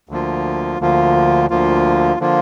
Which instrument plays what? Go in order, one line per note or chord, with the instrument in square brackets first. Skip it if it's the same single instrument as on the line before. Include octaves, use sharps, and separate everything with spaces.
[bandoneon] D2 D3 F3 A#3 F4
D2 D3 F3 A#3 F4
D2 D3 F3 A#3 F4
D3 F3 A#3 F4